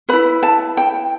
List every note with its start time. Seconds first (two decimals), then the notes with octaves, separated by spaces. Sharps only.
0.09 E4 B4 B5
0.43 A5
0.77 G5